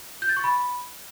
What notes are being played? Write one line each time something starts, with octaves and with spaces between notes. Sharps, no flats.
G6
A6
C#6
B5